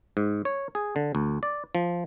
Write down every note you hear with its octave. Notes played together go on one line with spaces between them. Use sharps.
G#2
C#5
G#4
D3
D2
D5
F3